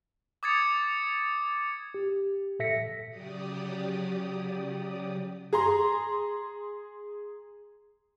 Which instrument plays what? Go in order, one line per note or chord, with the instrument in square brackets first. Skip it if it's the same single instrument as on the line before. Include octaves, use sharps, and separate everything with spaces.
[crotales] D6 D#6 G#6 A6 C#7
[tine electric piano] G4
A#2 A4 E5 A#6 B6 C#7
[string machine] C#3 F#3 G4 D5 D#6
[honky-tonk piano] G#4 A#5 C6